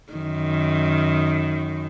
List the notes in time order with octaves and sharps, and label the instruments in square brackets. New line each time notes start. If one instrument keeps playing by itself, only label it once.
[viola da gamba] F#2 D#3